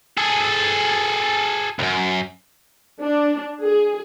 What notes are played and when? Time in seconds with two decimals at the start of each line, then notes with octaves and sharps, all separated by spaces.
0.17 G#4 A4
1.79 C#2 F#2
3.02 D4
3.63 G#4